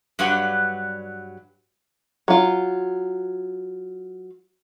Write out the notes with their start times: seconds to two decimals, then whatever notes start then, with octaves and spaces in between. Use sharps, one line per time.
0.19 G2 F#3 G3 G4 B4 F#5
2.28 F#3 F4